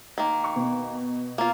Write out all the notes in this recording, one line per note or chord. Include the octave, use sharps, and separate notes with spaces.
D#3 A#3
C#6
B2
A#3 F4